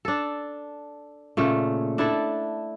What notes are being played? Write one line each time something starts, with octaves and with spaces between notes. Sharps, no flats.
D4 A4
A#2 C#3 A3
D4 E4 A4